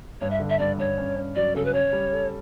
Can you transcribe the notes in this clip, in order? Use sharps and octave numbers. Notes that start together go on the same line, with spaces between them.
G2 C#5
E5
D3
E5
G2 D5
G2 C#5
C#4
C#4
F#3 D5
C#3 A4
B4
C#4 C#5
G3
A4